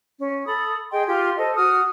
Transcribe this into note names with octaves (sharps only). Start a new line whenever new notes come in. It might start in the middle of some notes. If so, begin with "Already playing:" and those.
C#4
A4 B5 D#6
G#4 D#5 G5 C6
F4 G4 C6
A4 C5 D#5
F#4 D#6 F6